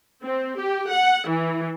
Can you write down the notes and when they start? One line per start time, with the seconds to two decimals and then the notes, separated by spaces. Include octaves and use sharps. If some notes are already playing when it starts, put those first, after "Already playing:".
0.23 C4
0.59 G4
0.89 F#5
1.28 E3